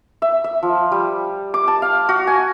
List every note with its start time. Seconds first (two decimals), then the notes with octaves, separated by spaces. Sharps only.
0.22 E5
0.44 E5
0.63 F3
0.92 G3
1.54 D6
1.68 A5
1.82 F5
2.09 F#4
2.27 G#5